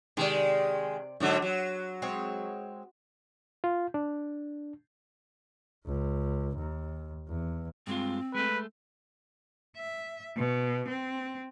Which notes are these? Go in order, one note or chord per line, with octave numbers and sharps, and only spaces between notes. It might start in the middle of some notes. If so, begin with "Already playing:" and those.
C3 D#3 G#3 D5
G#2 D3 F#3 C#5
F#3
G#3 C4 C#5
F4
D4
C#2
D#2
E2
G2 G#3 C4 F4
G#3 A3 B4
E5
B2
C4